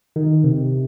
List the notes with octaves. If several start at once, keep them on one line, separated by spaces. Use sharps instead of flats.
D#3
C3